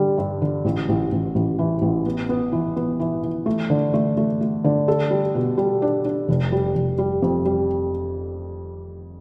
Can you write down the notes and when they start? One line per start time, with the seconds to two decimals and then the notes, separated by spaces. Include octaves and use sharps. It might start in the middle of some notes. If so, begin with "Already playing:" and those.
Already playing: D3 G3
0.18 G2
0.42 D3
0.65 A1
0.89 A1
1.12 A1
1.35 A1
1.59 E3
1.82 A1
2.06 B3
2.29 B3
2.52 E3
2.76 B3
3.00 E3
3.23 E3
3.46 A3
3.70 D3
3.94 A3
4.17 A3
4.41 A3
4.64 D3
4.88 A4
5.11 G3
5.35 B2
5.57 G3
5.82 D4
6.05 D4
6.29 F1
6.52 G3
6.75 F1
6.98 G3
7.22 F2
7.45 G3